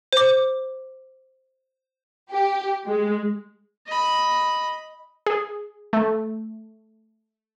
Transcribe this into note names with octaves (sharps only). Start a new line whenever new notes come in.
C5 D6
G4
G#3
D#5 B5
G#4
A3